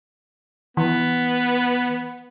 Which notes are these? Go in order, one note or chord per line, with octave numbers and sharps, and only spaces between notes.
E3 B3